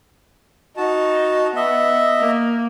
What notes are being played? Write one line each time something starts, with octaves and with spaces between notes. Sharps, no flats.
D#4 F#4 A5
B3 D#5 E5
A#3